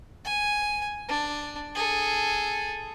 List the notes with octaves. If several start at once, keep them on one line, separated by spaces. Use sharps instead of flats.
G#5
D4
G#4 A4